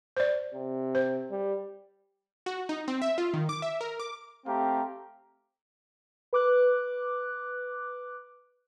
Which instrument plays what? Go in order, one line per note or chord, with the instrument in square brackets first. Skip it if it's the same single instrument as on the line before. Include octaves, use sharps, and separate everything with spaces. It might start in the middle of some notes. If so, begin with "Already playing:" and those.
[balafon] C5 D5
[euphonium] C3
[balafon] C5
[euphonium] G3
[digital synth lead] F#4
D#4
C4
E5
F4
D#3
D6
E5
A#4
D6
[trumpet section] A3 C4 G4 F5 A#5
[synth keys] B4 D6 F#6